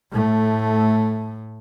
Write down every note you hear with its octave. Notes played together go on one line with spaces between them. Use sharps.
A2 A3